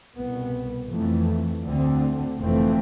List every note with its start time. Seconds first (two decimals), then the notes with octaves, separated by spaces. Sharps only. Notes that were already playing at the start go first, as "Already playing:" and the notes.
0.16 C2 B2 B3
0.90 F2 E3 A3
1.64 D2 D3 A3 C4
2.38 F1 F2 E3 A3 C4